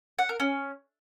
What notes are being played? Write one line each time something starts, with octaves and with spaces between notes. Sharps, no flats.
F#5
A#4
C#4